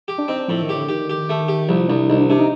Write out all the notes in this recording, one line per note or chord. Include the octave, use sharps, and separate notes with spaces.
G4
D4
C4 D#4
D4
A2 F3
D#3
G4
D3
D#3 G4
G4
A3
G4
C2 F3
C2 D4
C2 D#4
D4
C3 D4
D#4